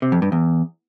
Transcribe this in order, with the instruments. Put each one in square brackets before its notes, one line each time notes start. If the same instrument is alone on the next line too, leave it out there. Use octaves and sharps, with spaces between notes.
[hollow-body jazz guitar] C3
F2
G2
E2